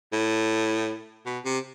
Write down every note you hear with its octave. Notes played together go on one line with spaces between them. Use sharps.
A2
B2
C3